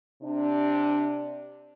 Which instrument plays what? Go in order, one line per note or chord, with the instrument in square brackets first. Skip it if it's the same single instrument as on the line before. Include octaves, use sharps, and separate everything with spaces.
[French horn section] C3 D4